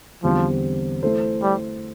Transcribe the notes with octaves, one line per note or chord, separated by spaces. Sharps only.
E2 D3 F3 G3 C4
E3 A3 E4 A4 C5
G3